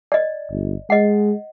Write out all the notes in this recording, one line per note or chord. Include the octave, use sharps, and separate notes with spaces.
D5 D#5
G1
G#3 D#5 F#5